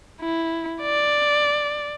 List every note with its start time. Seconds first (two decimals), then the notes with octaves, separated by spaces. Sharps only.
0.21 E4
0.81 D5